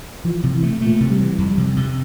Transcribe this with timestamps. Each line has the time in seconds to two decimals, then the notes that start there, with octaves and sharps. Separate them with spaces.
0.25 E3 F3
0.43 C3
0.54 E3
0.63 A3
0.81 A#2 A3
1.01 C3
1.10 G3
1.20 E3
1.38 F2 G3
1.58 C3
1.76 C3